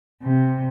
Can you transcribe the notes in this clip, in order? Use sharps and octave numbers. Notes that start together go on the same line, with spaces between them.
C3